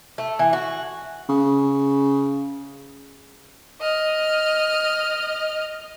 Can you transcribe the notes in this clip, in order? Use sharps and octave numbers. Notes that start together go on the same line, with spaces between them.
A3
E3
F#4
C#3
D#5 F6